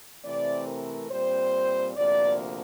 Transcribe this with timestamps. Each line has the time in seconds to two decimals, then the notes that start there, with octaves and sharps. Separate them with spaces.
0.24 C3 E3 A3 C4 D5
0.67 A#4
1.10 A#2 G3 C4 C5
1.96 D2 C3 F3 A#3 D5